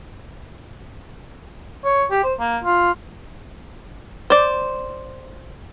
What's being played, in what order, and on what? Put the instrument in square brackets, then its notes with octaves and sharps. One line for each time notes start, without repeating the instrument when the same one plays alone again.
[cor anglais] C#5
G4
C5
A#3
F4
[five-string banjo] C5 D5